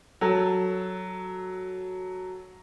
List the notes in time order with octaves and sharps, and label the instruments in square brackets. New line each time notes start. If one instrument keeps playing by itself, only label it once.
[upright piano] F#3 A4